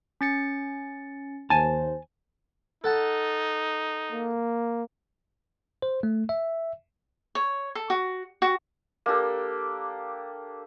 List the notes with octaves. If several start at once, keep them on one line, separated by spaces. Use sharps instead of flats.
C#4 A6 C#7
D#2 C5 G#5 A5
D#4 A4 F#5 A5
A#3
C5
A3
E5
C#5
A4
F#4
F#4
A#3 D4 G4 A4